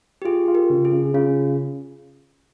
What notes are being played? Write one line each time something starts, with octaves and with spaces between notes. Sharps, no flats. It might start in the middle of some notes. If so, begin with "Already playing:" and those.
G4
F4 G#4
F4
G4 A#4
C#3
G#4
C#3
C#3 F4